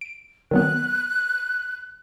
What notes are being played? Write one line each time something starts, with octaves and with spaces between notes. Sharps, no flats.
D7
D#3 F#3 B3 F#6